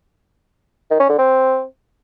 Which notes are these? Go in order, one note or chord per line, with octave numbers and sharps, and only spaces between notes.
D#3
C#4
D3
C4